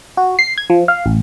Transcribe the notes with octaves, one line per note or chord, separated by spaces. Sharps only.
F#4
C7
G#6
F3
F5
A1